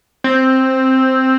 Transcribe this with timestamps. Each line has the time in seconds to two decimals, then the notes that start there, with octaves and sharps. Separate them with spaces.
0.24 C4